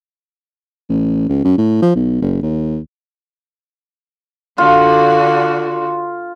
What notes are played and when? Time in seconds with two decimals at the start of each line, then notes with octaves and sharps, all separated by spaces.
0.90 A1
1.29 C#2
1.45 F#2
1.58 A2
1.82 F3
1.95 B1
2.22 F#1
2.43 D#2
4.58 D3 F4 F#4